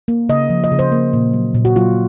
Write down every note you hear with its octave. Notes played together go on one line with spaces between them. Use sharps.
A#3
C#3 D#5
F3
D#5
C#3
C5
A#3
A#2
F#3
A#2
F#4
F#3 F4